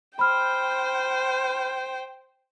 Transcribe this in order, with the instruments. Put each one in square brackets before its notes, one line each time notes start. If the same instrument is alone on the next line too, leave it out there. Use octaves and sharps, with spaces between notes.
[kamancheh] C5 G5 [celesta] B5 F6